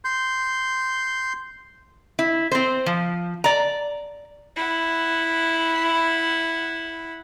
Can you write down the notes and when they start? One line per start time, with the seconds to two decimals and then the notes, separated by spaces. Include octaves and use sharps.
0.05 C6 G6
2.19 E4
2.52 C4 C5
2.86 F3
3.44 D5 A#5
4.56 E4 F#5